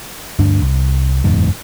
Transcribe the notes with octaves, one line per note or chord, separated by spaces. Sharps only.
D2 G2 D4
C2
F#1 E2 G#2